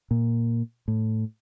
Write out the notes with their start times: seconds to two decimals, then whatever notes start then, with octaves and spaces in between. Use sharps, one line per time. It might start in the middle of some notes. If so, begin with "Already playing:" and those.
0.11 A#2
0.88 A2